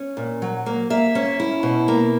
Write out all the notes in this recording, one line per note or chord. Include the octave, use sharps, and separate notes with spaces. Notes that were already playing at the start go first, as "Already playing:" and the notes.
Already playing: C#4
A#2
F#3
A#3
A#3 E5
C#4
E4
B2
A#3